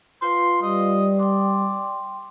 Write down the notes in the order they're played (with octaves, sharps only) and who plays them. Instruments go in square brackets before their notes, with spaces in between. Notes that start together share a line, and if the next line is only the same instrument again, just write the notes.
[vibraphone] F4 B4 F5 [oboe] C6
[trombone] G3 [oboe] D#5
[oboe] D5 [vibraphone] G5 C6